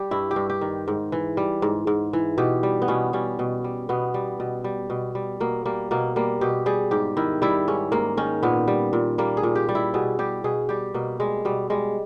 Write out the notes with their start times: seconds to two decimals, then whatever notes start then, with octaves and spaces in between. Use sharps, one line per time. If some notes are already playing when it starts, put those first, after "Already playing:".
Already playing: G3 G4
0.11 G2 E4
0.31 G4
0.36 G2
0.50 G4
0.61 D#3
0.88 G#2
1.12 E3
1.37 G3
1.62 G#2
1.87 G#2
2.13 E3
2.38 B2 G4
2.63 G3
2.82 B3
2.88 B2 C#4
3.13 G3 C#4
3.39 B2
3.64 G3
3.89 B2 B3
4.14 G3
4.40 B2
4.64 G3
4.90 B2
5.15 G3
5.40 B2 A#3
5.66 G3 A#3
5.91 B2 A#3
6.16 G3 A#3
6.41 B2 G4
6.66 G3 G#4
6.91 G#2 G4
7.17 D#3 E4
7.42 G3 E4
7.68 G#2 C#4
7.92 G#2 A#3
8.17 D#3 C#4
8.43 A#2 B3
8.68 G3
8.93 A#2
9.18 G3 A#3
9.37 G#4
9.43 A#2
9.55 G4
9.69 G3
9.75 E4
9.94 B2 G#4
10.19 G3 G4
10.44 B2 G#4
10.69 G3 G4
10.94 B2 A#3
11.20 G3 G#3
11.45 B2 G3
11.70 G3 G#3